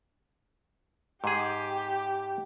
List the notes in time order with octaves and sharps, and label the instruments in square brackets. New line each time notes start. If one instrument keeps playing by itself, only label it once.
[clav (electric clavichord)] G#2 G#4 [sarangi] G4